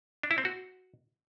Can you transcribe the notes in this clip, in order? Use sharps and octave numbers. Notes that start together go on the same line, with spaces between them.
D4
E4
C4
F#4